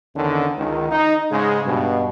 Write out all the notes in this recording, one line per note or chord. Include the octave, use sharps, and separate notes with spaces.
E2 D3 D#3 C#4
C#2 D#3
D#4
G#2 C#3 G#3
G2 B2